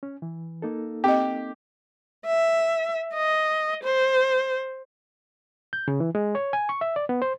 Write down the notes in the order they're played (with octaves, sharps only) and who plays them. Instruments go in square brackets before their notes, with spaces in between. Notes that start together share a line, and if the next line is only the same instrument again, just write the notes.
[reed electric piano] C#4
E3
A#3 D#4 A4
[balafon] C4 D#5 [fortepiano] G4
[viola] E5
D#5
C5
[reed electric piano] G6
C#3
E3
G#3
C#5
G#5
C#6
E5
D5
B3
C5